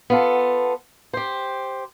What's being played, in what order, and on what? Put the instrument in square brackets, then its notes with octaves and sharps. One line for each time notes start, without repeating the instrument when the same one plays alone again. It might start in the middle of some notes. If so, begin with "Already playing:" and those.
[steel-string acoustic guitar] B3 F4 A4
G4 C5